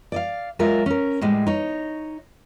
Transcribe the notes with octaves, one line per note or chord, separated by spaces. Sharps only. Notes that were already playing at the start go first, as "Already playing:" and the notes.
D5 D#5 F5
F#3 G#3 F4 A#4 E5
C#4 A#4
A2 G3 G#3
D#4 C#5